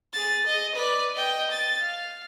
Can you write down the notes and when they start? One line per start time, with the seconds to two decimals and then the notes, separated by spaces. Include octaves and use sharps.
0.13 G#4 A6
0.46 D#5
0.75 B4 D5
1.15 D#5 G5
1.51 A6
1.80 F5